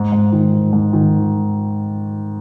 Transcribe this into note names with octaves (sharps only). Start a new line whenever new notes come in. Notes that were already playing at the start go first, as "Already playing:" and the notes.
Already playing: G#2
G#2
D#3
D#3
G#2
D#3